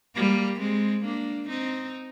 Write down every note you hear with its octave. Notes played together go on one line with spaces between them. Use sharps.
G3 A#3
G#3 C4
A#3 D4
C4 D#4